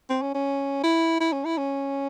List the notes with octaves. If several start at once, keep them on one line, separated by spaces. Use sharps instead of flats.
C4
C#4
C#4
E4
E4
C#4
E4
C#4